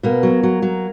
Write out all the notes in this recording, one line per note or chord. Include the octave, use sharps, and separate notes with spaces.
B2 A#3
F#3
F#3
F#3